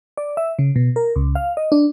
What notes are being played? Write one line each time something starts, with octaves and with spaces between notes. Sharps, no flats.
D5
E5
C#3
B2
A#4
C#2
F5
D#5
D4